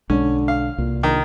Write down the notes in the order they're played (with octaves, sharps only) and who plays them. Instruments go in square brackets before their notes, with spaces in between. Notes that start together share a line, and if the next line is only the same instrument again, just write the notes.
[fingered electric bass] B1 G#3 D4 [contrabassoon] D3 [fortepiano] C#4
[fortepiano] F5
[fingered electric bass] C2 [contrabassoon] A#2
[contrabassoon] A#1 [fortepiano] D#3